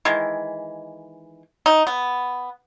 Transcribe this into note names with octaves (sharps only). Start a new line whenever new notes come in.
D#3 E3 G#3
D#4
B3